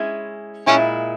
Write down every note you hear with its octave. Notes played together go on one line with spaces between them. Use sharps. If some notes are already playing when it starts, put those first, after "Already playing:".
Already playing: G#3 C#4 E4
A#2 G#3 C#4 E4